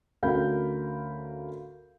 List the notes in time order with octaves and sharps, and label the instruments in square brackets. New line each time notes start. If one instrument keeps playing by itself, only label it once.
[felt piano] D2 C#4 A#4 F5 B5 G6